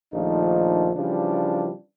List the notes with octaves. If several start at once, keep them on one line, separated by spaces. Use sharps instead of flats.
A#1 D#3 F3 A3 D4 D#4
C#3 E3 F3 G3 D4